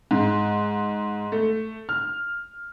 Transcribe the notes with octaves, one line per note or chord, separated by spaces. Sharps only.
G#2
A3
F6